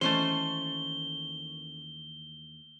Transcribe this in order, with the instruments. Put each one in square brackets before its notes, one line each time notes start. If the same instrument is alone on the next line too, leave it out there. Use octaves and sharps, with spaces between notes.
[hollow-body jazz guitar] D#2 E3 [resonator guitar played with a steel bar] A3 C#4 C5 [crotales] G7